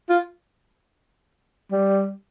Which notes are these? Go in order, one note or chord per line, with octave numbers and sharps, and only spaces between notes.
F4
G3